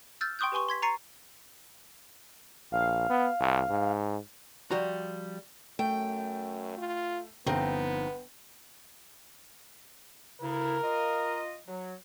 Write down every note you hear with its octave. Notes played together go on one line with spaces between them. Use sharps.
E6 F6 G6 A6
G5 C6 C#6 D#6 F#6 G6
G4 B4 G#5 C6 C#6
C6 G#6 B6
A#5 C#6 A6 C7 C#7 D#7
A#1 F5
B3
C2
G#2
F3 G3 F#4 A#5
F#2 A3 G5
F4
G1 F3 B3 C4 D#4 G5
D2 C#3 E4 A#4
F4 D#5
F#3